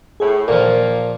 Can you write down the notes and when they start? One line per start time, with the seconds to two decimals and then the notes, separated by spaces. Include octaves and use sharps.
0.20 A2 G#4
0.48 A#2 D#3 F3 A#3 A#4